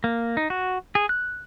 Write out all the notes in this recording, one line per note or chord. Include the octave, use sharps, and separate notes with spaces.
A#3
D#4
F#4
G#4
F#6